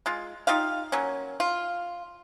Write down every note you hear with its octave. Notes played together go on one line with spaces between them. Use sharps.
G#3 F4
D#4 F4 G4 F5
F#3 A#3 C#4
F4